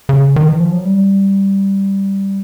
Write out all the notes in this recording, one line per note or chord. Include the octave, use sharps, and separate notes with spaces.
C#3
D#3
E3
F3
F#3
G3